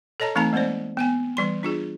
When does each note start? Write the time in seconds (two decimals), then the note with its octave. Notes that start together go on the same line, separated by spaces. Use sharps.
0.20 A4 C#5 D#5 A5 A#5
0.35 E3 A3 C4 D#4 A5 A#5
0.53 G#3 A#3 C4 C5 D5
0.97 B3 G5 G#5
1.37 E3 G3 C6
1.63 D4 F4 G#4